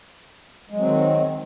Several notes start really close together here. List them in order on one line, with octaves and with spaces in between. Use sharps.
G#3 F#3 C4 D#3